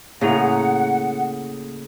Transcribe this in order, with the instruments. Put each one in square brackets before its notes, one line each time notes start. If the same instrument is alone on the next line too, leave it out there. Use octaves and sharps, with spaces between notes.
[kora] A2 C#3 [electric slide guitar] A#3 G#4 A#5 [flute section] F#5